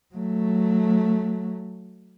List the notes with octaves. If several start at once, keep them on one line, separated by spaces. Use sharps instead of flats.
F#3 A3